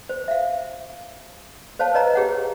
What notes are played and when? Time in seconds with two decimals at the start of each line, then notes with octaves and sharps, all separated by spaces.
0.09 C5
0.28 E5 F5
1.79 C5 C#5 F5 A5
1.94 B4 C#5 D#5 A#5
2.15 G4 G#4 C#5 F#5